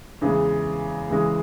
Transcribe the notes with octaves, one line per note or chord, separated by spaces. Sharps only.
E2 C#3 E3 G#3
E2 C#3 E3 G#3